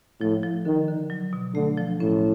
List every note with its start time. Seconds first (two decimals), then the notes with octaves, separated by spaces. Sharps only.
0.20 A2 F3
0.43 F3
0.65 D3 D#3
0.88 D3
1.10 F#3
1.33 B2
1.54 D3 A3
1.77 F3
2.00 A2 C#4